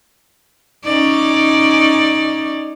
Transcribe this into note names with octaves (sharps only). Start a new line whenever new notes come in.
C#4 D#4 D5